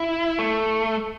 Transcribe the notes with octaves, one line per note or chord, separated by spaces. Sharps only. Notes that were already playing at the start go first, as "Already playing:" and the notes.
Already playing: E4
A3